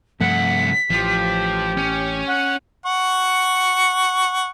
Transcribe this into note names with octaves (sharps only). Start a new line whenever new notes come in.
C2 G2 F3 A3 F#5 B6
A1 F3 F4 G4
C#4
F#5
F#5 C#6